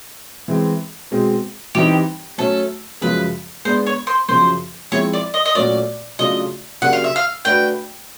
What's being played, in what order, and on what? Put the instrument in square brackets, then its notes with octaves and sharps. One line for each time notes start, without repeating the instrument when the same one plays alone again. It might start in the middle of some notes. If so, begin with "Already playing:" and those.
[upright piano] E3 G#3 C4
B2 G#3 C4
[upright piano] E3 G3 C4 D#4 [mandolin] G4
[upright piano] F#3 A3 C#4 [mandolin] A4
[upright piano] F#2 C#3 F3 G#3 [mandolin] B4
[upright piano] G#3 B3 D4 [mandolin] C5
[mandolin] C#5
C5
[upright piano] F#2 C#3 F3 [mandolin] C5
[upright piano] F3 G#3 C4 E4 [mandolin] C#5
[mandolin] D5
D#5
D#5
[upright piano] A#2 F#3 A3 C#4 F#4 [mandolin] D5
[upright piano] C#3 F#3 A3 D4 F4 [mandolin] D#5
[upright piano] C#3 F#3 A#3 D4 G4 [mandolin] F#5
[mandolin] F5
E5
F5
[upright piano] A3 D4 F#4 B4 [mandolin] G5